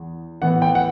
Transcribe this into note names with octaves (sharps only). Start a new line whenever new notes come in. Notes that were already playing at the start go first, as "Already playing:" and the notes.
Already playing: E2
A2 E3 B3 F#5
G5
F#5